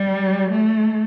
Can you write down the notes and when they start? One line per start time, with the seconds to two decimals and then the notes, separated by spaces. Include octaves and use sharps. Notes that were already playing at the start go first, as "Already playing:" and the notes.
Already playing: G3
0.51 A3